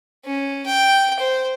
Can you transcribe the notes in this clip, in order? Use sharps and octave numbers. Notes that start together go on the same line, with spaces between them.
C#4
G5
C5